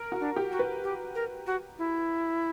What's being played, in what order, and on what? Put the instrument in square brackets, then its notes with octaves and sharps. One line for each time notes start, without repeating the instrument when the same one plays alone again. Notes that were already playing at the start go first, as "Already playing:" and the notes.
Already playing: [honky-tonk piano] A#4
F#4
[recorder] D4
[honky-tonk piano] G4
[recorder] F#4
[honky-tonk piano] B4
[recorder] G4
A#4
F#4
E4